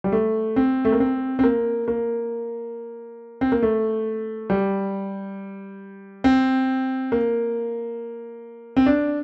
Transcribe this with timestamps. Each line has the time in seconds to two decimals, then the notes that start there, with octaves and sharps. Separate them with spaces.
0.04 G3
0.12 A3
0.56 C4
0.85 A3
0.92 A#3
1.00 C4
1.39 C4
1.44 A#3
1.88 A#3
3.41 C4
3.52 A#3
3.63 A3
4.50 G3
6.24 C4
7.12 A#3
8.77 C4
8.86 D4